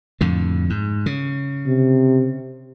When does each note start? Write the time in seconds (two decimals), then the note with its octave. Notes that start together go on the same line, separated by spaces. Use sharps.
0.21 F2 A2 D3
0.70 G#2
1.06 C#3
1.67 C3